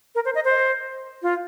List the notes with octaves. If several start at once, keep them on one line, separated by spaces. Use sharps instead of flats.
A#4
C5
D#5
C5
F4